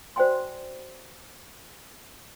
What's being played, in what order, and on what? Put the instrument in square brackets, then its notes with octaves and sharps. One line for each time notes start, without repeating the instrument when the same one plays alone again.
[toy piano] F#4 C5 D5 G5 G#5 C6